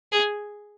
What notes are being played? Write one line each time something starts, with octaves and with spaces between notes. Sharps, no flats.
G#4